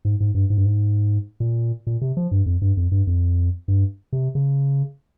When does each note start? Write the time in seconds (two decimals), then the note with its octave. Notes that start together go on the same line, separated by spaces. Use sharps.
0.05 G#2
0.20 G#2
0.35 G2
0.50 G#2
0.58 G2
0.66 G#2
1.40 A#2
1.87 A#2
2.01 C3
2.17 F3
2.31 G2
2.46 F2
2.62 G2
2.77 F2
2.92 G2
3.07 F2
3.68 G2
4.13 C3
4.35 C#3